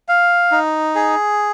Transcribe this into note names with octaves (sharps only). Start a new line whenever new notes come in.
F5
D#4
G#4